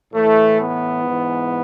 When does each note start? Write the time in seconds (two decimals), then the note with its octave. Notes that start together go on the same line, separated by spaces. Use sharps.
0.13 A2 E3 A3
0.60 B3
1.05 G#2 E3